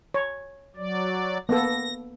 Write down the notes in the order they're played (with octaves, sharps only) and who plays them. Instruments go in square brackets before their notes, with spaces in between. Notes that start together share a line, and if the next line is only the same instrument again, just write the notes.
[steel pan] C#5
[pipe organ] F#3 D5
[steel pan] A#3 B3 A4 [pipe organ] A#6